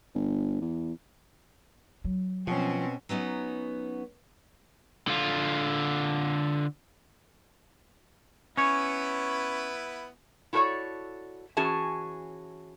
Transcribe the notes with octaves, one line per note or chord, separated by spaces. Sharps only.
G1
E2
F#3
B2 F3 C4 C#4
F#3 B3 C#4 D#4
D3 F4
B3 C#4 E4 B4 C#5
E4 F#4 A4 B4 C#5 D5
E3 C#4 F#4 G#4 A5